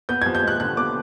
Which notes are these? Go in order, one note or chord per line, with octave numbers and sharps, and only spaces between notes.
B3 G6
F3 G#6
G6
G#3 F#6
D3 F#6
B3 D6